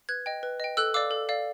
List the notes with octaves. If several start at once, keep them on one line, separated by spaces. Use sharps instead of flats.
B4 F#6 G#6
D#5 G5
B4
D#5 G5
A4 E6 F#6
D5 F5 D6 E6
A4
D5 F5